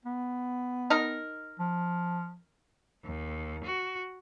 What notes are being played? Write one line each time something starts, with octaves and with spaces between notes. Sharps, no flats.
B3
D#4 A#4
F3
D#2
F#4